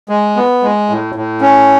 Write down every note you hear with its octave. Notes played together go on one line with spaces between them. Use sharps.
G#3
B3
G#3
A2
A2
C#4